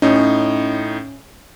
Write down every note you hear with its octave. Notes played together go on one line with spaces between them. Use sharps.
A2 C#4 D#4